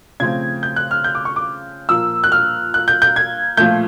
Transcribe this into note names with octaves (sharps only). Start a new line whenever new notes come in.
C#3 F3 A3 C4 G#6
G6
F#6
F6
G6
D6
C#6
D6
A#2 F3 A#3 E6
F#6
F6
F#6
G6
G6
G#6
A#2 F3 A3 G6